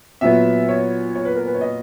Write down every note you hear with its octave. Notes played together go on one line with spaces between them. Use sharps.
A#2 F#3 B3 E5
C#5
C#5
B4
A#4
B4
C#5
D#5